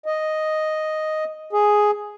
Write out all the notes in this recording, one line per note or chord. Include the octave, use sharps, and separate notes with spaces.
D#5
G#4